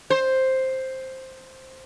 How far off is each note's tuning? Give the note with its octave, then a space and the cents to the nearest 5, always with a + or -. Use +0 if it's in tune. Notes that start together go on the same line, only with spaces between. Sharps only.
C5 +5